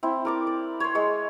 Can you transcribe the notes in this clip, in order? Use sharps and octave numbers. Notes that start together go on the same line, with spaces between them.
C4 E4
A#4 D5 D6
D5
C5 C#5
G#3 C#5 E6